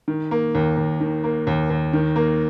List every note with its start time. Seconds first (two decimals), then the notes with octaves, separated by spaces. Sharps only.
0.08 D#3
0.31 A#3
0.55 D#2
0.77 D#2
1.00 D#3
1.24 A#3
1.47 D#2
1.70 D#2
1.93 D#3
2.16 A#3